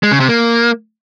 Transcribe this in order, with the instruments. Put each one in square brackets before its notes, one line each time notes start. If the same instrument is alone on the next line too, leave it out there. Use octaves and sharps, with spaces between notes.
[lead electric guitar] G#3
C#3
C3
A#3